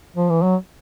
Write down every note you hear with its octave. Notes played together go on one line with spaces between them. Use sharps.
F3
E3
F#3